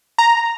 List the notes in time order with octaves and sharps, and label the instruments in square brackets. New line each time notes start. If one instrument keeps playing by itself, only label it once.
[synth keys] A#5